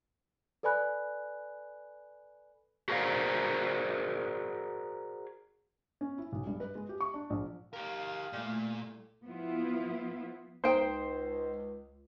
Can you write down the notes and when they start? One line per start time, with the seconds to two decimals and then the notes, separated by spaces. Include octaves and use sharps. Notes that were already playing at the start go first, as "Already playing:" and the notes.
0.63 A4 B4 D5 G#5 B5 F#6
2.88 F#4 G#4 A#4 C5 D5 F5
6.01 C#4
6.18 E4
6.32 B1
6.47 G2
6.60 B4
6.75 G#3
6.89 G4
7.00 C#6
7.14 D4
7.30 A#1
7.73 G4 A#4 F5
8.33 A#2 G3 A3 E4
9.25 F3 B3 E4 F4
10.64 C#2 D#4 C5 G5